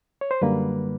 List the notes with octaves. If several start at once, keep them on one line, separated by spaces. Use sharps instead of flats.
C#5
C5
F#2 D3 G3 A#3 B4